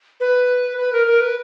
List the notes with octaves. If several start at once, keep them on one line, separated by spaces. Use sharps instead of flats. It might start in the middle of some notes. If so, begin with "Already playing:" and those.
B4
B4
A#4
A#4
B4